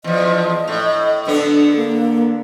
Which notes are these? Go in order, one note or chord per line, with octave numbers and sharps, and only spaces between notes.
E2 F3 D#5
A2
D3 B3 D4 A4
A#3